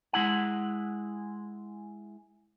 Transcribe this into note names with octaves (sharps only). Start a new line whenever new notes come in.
G#3 E4 F#5